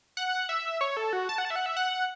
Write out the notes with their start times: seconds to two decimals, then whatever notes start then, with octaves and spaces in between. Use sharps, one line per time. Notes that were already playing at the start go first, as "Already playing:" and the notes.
0.17 F#5
0.49 E5
0.81 C#5
0.97 A4
1.13 F#4
1.29 A5
1.38 F#5
1.45 A5
1.50 E5
1.56 F#5
1.66 E5
1.77 F#5